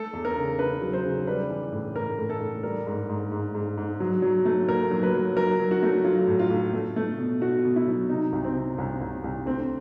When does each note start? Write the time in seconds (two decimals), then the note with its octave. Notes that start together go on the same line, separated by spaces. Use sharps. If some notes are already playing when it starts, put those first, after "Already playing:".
Already playing: A3 A4
0.13 E2
0.25 A#4
0.36 C#3
0.59 C#3 B4
0.81 F#3
0.93 C5
1.05 C#3
1.27 G3 B4
1.50 E3
1.72 A2
1.96 A2 A#4
2.18 A2
2.30 A4
2.40 A2
2.63 G3 A#4
2.87 G#2
3.09 G#2
3.32 G#2
3.55 G#2
3.78 G#2
4.00 F#3
4.22 F#3
4.45 A3
4.68 A#2 A#4
4.91 F#3
5.03 B4
5.14 F#3
5.36 F#3 A#4
5.60 F#3
5.71 F#4
5.83 A3
6.04 F#3 F4
6.27 A2
6.39 F4
6.50 A2
6.73 A3
6.96 A3
7.18 B2
7.41 B2 F#4
7.65 B2
7.76 E4
7.88 F#3
8.09 C3 D#4
8.32 C2
8.44 C4
8.55 C3
8.78 C2
9.01 C2
9.24 C2
9.46 D2 C4